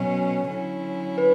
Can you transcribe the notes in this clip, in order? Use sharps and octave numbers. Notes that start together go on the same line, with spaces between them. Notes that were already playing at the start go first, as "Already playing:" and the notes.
Already playing: B2 F#3 C#4
D3 F#3 C#4 E4
B4